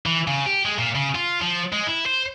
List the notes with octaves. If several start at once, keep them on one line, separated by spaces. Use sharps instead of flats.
E3
C#3
G4
G#3
A#2
C#3
F4
F3
G#3
E4
C5